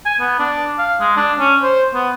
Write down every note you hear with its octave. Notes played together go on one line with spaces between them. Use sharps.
G#5
B3
D4
F5
G#3
D4
C#4
C5
B3